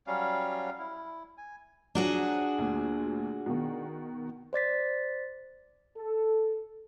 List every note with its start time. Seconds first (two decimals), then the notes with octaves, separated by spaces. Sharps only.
0.07 F#3 G3 C#4 F5
0.79 E4
1.38 G#5
1.95 F3 F#3 D4 F#4 G#4
2.58 D2 A#2
3.46 B2 D#3
4.53 C5 D5 A6 B6
5.96 A4